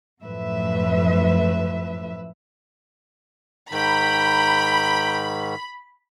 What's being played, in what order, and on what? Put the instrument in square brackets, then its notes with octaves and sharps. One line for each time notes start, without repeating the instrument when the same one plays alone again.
[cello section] F#2 A2 F3 B4 E5
[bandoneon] G#2 D#3 [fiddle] G5 A#5 [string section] B5